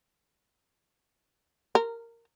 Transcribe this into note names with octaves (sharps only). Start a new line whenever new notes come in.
A#4